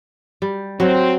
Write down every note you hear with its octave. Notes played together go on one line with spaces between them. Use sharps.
G3
F#3 C4